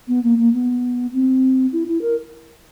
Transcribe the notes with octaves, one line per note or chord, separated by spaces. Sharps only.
B3
A#3
A#3
B3
C4
E4
E4
A#4